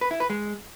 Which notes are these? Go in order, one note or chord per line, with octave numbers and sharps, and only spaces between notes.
B4
E4
B4
G#3